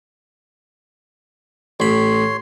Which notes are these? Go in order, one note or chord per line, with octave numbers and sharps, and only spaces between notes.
A1 C#5 B5 C6